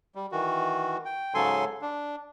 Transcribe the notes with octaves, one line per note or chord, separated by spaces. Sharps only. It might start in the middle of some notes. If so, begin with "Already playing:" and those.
G3
D#3 E3 F#4
G5
G#2 C#3 F#3 A4 G#5 C6
D4